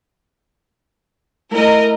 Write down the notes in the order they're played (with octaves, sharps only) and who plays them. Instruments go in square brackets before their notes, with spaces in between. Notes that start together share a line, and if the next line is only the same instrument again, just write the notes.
[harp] A3 E4 [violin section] A#4 D#5